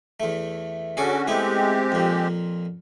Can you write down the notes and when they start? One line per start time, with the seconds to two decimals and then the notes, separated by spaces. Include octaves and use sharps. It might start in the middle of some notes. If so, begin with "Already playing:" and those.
0.20 E2 A3
0.97 D3 C#4 F#4 G#4 A4 D5
1.27 G#3 A3 B3 C4 E4 G4
1.92 F2 A#2